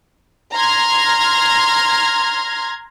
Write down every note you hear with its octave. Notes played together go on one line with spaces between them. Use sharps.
A#5 C6 F6 G#6 A#6